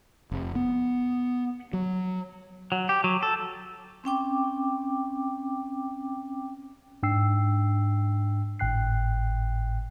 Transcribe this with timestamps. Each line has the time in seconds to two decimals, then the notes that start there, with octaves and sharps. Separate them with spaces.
0.32 F1
0.55 B3
1.73 F#3
2.72 F#3
2.89 G4
3.04 F#3
3.23 A4
4.04 C4 C#4 G5 D6
7.03 G#2 D4 G5 E6 C7
8.59 G#1 A2 G5 F#6 C7